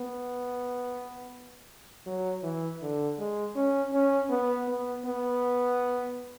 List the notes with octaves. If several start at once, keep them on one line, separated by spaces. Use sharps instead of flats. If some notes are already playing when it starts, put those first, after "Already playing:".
Already playing: B3
F#3
E3
D3
G#3
C#4
C#4
B3
B3
B3